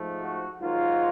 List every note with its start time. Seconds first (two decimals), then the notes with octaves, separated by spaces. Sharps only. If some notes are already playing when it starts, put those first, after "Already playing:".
Already playing: G#2 F3 A3
0.22 F#4
0.61 G#2 D#3 F#3 A#3 F4